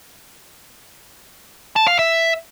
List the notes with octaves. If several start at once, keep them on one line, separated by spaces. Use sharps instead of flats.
A5
F5
E5